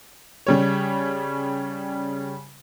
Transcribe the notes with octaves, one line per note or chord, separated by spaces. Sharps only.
C#3 G3 C#5